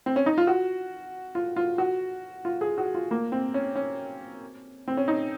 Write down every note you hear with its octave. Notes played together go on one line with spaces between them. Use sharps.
C4
C#4
D#4
F4
F#4
F4
F4
F#4
F4
G#4
F#4
F4
A#3
C4
C#4
C#4
C4
C#4
D#4